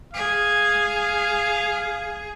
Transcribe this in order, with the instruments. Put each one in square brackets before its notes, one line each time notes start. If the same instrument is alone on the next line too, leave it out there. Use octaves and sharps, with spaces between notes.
[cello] G#4 [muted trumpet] F5